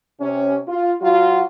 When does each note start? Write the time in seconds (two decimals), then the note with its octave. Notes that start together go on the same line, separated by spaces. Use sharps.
0.21 C3 C#4
0.68 F4
1.02 F#3 F4 F#4